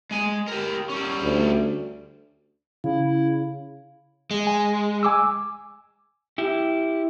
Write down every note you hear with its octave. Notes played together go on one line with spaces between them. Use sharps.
G#3 G#5
G4 A#4
G3 C#4
D2
C#3 E4 F5
G#3
G#5
G#5 D6 E6
E4 G4